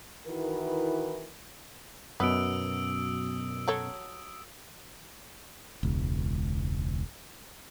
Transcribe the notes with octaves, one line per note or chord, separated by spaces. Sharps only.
D#3 E3 E4 F#4 A#4 B4
F#2 B2 B3 D#6 E6 D7
F#3 A4 C#5
E1 C#2